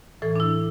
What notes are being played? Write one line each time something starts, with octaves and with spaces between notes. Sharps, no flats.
A2 E3 A4
D4
E4